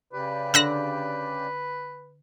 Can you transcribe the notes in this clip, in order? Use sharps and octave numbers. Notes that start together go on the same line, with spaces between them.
C#3 G4 B4 D5
D3 E6 F#6 A#6